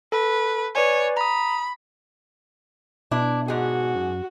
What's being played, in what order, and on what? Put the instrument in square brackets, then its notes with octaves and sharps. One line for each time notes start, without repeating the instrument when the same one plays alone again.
[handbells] A4 [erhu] B4
[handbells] B4 D5 G#5 [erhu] C#5
[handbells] A#5 D#6 [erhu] B5
[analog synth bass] B2 [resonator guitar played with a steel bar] D4 E4
[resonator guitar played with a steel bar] G#2 G#4 [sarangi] F#4
[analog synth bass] F#2